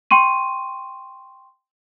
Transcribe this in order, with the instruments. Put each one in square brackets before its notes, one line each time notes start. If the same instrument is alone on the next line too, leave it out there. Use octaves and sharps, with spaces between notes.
[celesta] G5 C6 C#6 D#7